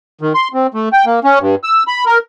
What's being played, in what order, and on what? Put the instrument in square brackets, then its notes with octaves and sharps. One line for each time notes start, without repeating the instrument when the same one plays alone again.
[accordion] D#3
C6
C4
A3
G5
A#3
C#4
G2
E6
B5
A#4